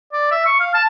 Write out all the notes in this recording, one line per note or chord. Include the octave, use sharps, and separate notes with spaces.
D5
E5
C#6
F5
A5